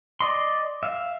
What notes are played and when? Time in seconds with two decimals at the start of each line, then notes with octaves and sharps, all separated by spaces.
0.20 D5 D#5 C6
0.83 E5 F5